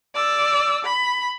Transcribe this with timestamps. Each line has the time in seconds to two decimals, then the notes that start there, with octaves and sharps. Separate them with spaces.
0.15 D5 E6
0.84 B5